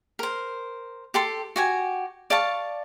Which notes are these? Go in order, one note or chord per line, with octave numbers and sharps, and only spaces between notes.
A#4 C5
G4 A4 C6
F#4 G4 G#5
D5 F5 A5 C#6